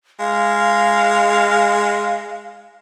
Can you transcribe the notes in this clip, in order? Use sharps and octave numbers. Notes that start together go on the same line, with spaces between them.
G#3 F5